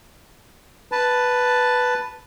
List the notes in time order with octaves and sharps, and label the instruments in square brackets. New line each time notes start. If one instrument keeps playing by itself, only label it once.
[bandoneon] B4 A5